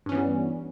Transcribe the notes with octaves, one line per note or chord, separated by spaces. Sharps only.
G2 E3 G3 B3 C#4